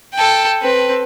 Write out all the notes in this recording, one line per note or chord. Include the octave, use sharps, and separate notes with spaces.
A4 G5
C4 B4